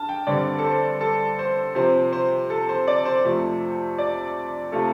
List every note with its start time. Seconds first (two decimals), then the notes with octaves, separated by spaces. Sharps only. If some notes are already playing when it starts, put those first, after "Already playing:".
Already playing: D4 A5 F6
0.09 G5
0.27 G2 D3 G3 C4 D5
0.59 A4
0.64 C5
1.01 A4
1.39 C5
1.75 C3 F3 C4 C5
2.13 C5
2.50 A4
2.69 C5
2.88 D5
3.05 C5
3.24 F2 C3 F3 A3
3.98 D5
4.72 C3 A3 F4 A4